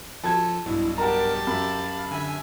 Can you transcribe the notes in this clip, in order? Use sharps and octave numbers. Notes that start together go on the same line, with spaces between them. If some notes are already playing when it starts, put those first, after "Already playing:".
F3 A4 A5 G#6
B1 G2 B2 E4
G4 A#4 F#5 A5 A#5
F#2 F5 B5
D3 E5 G#5